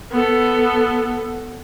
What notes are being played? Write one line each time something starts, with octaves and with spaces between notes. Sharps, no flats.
B3 A4